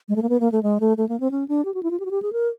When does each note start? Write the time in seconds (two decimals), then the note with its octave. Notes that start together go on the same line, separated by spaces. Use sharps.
0.09 G#3
0.16 A3
0.22 A#3
0.29 B3
0.40 A#3
0.52 A3
0.63 G#3
0.80 A3
0.97 A3
1.09 A#3
1.20 C4
1.31 C#4
1.48 D4
1.65 G4
1.74 F#4
1.83 E4
1.91 F4
2.00 G4
2.05 F#4
2.11 G4
2.22 G#4
2.33 A#4